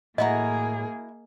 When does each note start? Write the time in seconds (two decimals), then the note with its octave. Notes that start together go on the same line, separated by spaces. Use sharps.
0.18 A2 A#3 E4 F#4 G#4 D#5 A#5